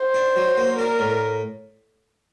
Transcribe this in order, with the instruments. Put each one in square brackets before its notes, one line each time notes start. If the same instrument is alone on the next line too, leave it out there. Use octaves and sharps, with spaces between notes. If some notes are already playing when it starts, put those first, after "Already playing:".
Already playing: [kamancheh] C5
[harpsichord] D4
F#3
A#3
[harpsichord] D4 [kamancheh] A#4
[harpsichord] A2